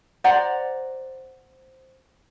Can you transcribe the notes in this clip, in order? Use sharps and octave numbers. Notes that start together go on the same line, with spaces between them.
C5 D5 F#5 A#5